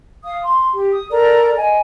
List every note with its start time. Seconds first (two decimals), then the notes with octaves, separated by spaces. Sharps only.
0.25 F5 D#6
0.43 C6
0.73 G4
0.91 D#6
1.10 A4 A#4 D5 A#5
1.57 D#5 G#5